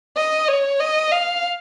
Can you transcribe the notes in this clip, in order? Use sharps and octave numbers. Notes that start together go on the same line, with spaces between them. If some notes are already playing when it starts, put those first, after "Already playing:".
D#5
C#5
D#5
F5